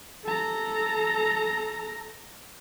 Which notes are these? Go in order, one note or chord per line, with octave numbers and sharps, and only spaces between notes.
A4 A#5